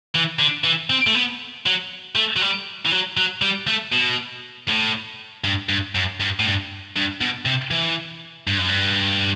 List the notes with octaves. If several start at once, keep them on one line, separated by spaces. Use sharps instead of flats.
E3
D3
E3
C4
A3
B3
F#3
A3
F#3
G3
E3
F#3
F#3
G3
A3
B2
A2
G2
G2
F#2
G2
A2
G2
G2
B2
C3
E3
G2
F#2
G2